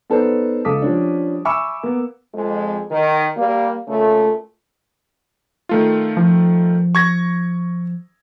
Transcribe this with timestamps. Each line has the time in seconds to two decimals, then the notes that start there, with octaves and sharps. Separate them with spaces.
0.10 B3 D#4 A4 B4 C5 D5
0.65 C#2 A4 D6 D#6 B6
0.82 F3 G3 C#4 D4
1.45 E5 G#5 B5 C#6 D6 E6
1.83 A#3 B3
2.34 F2 G#3
2.91 D#3
3.37 G3 A#3
3.88 A#2 C#3 A3
5.69 D#3 A3 F4
6.17 F3
6.95 C#6 G#6 A#6